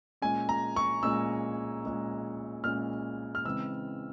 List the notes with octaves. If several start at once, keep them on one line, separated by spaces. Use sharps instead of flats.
A#2 G#3 C#4 G#5
A#5
C#6
A#2 G#3 C#4 E6
A#2 G#3 C#4
A#2 G#3 C#4 F6
F6
C#3 E3 G#3 C4 E6